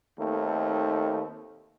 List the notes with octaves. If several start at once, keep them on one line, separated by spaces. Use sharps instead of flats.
D#2 A3 C4 D#4 A4